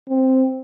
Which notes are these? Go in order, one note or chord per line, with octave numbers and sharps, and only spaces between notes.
C4